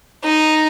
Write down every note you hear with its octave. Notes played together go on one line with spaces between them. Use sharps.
D#4